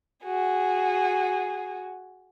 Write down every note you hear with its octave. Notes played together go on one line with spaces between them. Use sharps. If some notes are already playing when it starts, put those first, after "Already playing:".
F#4 G#4